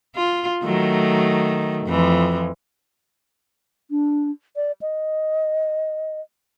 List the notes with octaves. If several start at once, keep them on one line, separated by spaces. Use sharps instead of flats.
F4
D#3 F#3 A3
F2 E3 F3
D4
D5
D#5